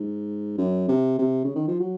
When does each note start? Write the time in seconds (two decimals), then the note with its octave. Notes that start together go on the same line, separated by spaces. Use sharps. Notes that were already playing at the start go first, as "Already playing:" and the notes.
Already playing: G#2
0.58 F#2
0.88 C3
1.19 C3
1.44 C#3
1.55 D#3
1.68 F3
1.80 F#3